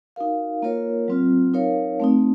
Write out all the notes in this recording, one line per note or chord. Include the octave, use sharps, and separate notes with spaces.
D#4 F#4 A#4 F5
A#3 F4 A#4 C#5
F#3 C4 F4
D#4 A#4 C#5 F5
A3 C4 D#4